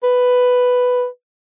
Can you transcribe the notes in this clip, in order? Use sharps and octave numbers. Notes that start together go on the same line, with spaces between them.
B4